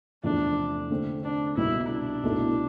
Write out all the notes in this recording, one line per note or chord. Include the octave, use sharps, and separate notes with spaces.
E2 C3 F3 A3 D4
D3 A3 C4
D4
C2 B2 G3 E4
D4
C2 B2 A3 E4 A4